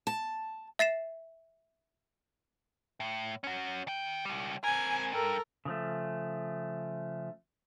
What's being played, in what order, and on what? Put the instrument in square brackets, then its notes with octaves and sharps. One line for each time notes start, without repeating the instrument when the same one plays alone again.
[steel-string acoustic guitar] A5
[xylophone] E5 A6 C7 E7
[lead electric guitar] A2
C#4 F#4
D#3 G5
C#2 G3
[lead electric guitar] C4 A#4 [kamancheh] G#5
[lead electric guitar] G2 [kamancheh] A4 A#4
[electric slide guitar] C#3 F3 A3